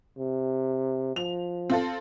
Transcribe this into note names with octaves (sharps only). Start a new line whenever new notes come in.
C3
F3 F7
C4 F4 A4